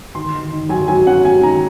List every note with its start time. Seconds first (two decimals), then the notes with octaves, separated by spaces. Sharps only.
0.15 D#3 C6
0.33 D#3
0.52 D#3
0.69 F#3 G#5
0.88 F#3 G#5
1.07 C#4 F#5
1.24 C#4 G#5
1.43 D#3 A#5